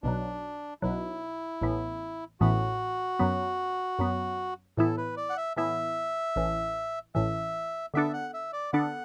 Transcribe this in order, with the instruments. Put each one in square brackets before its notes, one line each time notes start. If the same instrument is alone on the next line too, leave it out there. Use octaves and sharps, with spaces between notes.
[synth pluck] B1 B2 F#3 [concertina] D4
[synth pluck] B1 B2 F#3 [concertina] E4
[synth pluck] A1 A2 E3 B3
[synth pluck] A1 A2 E3 B3 [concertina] F#4
[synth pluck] F#2 F#3 B3
F#2 F#3 B3
[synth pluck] A2 E3 B3 E4 [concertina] A4
[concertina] B4
D5
F#5
E5
[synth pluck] A2 E3 B3 E4 [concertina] E5
[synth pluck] A1 A2 E3
[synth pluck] A1 A2 E3 [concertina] E5
[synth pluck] D3 B3 D4 A4 [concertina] E5
[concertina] F#5
E5
D5
[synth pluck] D3 B3 D4 A4 [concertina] F#5